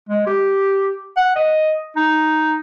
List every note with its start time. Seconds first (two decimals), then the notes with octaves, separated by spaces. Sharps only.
0.09 G#3
0.27 G4
1.17 F#5
1.36 D#5
1.96 D#4